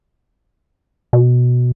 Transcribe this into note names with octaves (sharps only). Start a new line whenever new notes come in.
B2